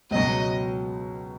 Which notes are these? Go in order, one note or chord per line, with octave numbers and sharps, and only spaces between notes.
C#2 B2 F#3 D#5